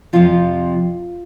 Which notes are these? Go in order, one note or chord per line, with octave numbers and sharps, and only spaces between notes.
F2 C3 F3 F4